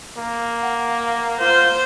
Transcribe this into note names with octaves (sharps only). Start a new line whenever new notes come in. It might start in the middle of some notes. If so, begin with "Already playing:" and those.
A#3
F#5
F4 C5